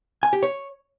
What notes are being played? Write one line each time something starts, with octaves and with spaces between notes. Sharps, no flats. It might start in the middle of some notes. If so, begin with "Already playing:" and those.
G#5
G4
C#5